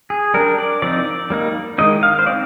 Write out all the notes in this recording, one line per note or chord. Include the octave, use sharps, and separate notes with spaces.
G#4
G3 D4 A#4
D5
F3 C4 D#4 D5
G3 A#3 D#4
D#3 G#3 D#4 D#5
F5
C5
C4 D#4 D5